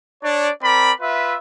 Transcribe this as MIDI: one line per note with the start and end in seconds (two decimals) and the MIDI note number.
0.23 0.50 62
0.23 0.50 73
0.23 0.50 74
0.62 0.92 60
0.62 0.92 70
0.62 0.92 74
0.62 0.92 83
1.01 1.36 65
1.01 1.36 71
1.01 1.36 76